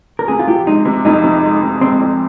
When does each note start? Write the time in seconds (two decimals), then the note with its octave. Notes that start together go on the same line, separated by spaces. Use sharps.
0.19 A#4
0.28 C3 G#4
0.39 F4
0.47 F3 G4
0.67 G#3 D#4
0.85 C3
1.05 F2 D#4
1.24 C3
1.44 G#3
1.63 C3
1.81 G#3 C4
2.01 F2